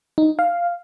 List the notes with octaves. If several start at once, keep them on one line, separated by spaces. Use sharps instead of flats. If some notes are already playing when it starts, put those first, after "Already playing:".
D#4
F5